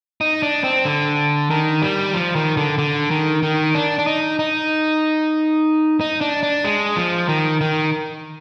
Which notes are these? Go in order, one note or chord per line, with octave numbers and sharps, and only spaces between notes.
D#4
D4
C4
D3
D#3
G3
F3
D#3
D3
D3
D#3
D#3
D4
D4
D#4
D#4
D#4
D4
D4
G#3
F3
D#3
D#3